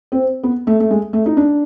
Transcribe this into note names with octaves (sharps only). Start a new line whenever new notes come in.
C4
B3
A3
A3
G#3
A3
D#4
D4